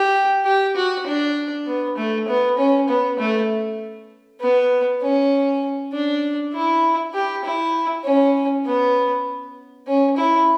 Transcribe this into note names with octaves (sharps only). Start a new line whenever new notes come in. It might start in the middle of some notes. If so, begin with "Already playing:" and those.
Already playing: G4
G4
F#4
D4
B3
A3
B3
C#4
B3
A3
B3
C#4
D4
E4
G4
E4
C#4
B3
C#4
E4